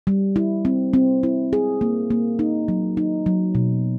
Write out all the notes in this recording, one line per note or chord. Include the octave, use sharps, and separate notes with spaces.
G3
E4
C4
C4
E4
G#4
A#3
A#3
D#4
F#3
D#4
F#3
B2